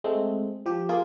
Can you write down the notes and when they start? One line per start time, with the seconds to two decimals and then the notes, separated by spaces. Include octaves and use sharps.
0.04 G#3 A3 C4
0.66 F3 G4
0.89 A#3 F4 G#4